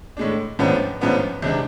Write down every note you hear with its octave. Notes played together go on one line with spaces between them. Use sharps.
A2 G#3 D4
A1 G#2 F3 B3 D4
A1 G#2 F3 B3 D4
C2 C3 G#3 D4